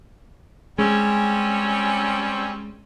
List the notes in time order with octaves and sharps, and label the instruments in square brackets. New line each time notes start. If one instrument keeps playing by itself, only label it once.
[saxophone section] G3 C4 C#4 [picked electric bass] G#3